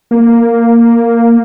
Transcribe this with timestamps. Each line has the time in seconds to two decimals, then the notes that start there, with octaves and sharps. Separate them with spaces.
0.11 A#3